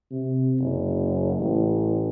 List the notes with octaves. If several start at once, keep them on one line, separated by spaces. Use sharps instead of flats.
C3
F#1
A1